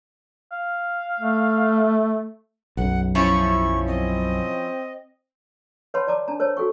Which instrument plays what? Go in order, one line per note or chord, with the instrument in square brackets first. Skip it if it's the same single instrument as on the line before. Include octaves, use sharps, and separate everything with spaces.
[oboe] F5
[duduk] A3
[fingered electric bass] B1 F#2 [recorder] F#5
[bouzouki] F3 C#4 E4 [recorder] C#6
[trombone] C4 [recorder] D#5
[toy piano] B4 C#5 F#5 A5 B5 C6
D5 A5 A#5 D6
D4 A5 A#5
A#4 C5 C#5 A5
F#4 A4 G5 C#6